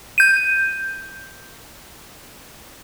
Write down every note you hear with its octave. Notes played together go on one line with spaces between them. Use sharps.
G6 D#7